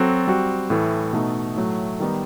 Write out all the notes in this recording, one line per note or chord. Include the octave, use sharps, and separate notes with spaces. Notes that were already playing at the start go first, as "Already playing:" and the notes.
Already playing: F#3 C4 F#4 A4
G3 C4 F#4
A2 E3 A3
B2 A3 D#4 A4
A2 F#3 A3
D#3 G3 B3 D#4